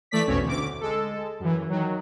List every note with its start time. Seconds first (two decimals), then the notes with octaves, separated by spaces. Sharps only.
0.11 E3 A3 D5 B6
0.27 A#1 E2 B2 C4 C#4 C#5
0.45 D2 D6
0.80 G#3 A4
1.40 F#2 E3
1.69 D#3 F#3